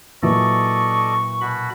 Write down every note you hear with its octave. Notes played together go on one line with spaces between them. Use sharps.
A#2 E3 F#3 A4 D5 D#5 C#6
B2 F#4 B5